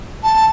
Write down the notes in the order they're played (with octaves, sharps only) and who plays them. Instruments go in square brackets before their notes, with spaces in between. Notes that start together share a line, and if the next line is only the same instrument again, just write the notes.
[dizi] A5